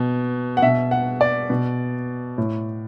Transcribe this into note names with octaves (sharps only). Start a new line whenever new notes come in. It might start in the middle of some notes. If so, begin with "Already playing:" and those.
Already playing: B2
F#5
B2 E5
F#5
D5
B2
A2